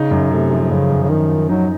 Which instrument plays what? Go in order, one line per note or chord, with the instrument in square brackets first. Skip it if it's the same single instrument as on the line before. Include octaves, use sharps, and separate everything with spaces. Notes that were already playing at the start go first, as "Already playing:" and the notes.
Already playing: [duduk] C#3 [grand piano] D#4
[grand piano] F#2
[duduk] C3 [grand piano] A3
[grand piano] F3
[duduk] C3
[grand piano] F#2 [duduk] C#3
[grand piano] F#2
[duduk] C#3
[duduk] D#3 [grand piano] D#4
[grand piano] F3
[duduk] F#3 [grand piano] D#4